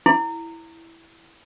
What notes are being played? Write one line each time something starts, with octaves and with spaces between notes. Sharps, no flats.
E4